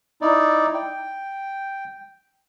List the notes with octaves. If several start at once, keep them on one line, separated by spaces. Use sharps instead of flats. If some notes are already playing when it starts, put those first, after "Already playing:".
D#4 E4 D5
G5